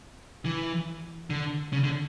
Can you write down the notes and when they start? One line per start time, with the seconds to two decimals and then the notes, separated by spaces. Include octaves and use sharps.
0.45 E3
1.30 D3
1.73 C#3
1.84 D3